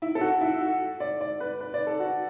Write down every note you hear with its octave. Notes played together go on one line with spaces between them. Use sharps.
E4
A4
F#4
E4
F#4
D5
D5
B4
B4
D5
A4
F#4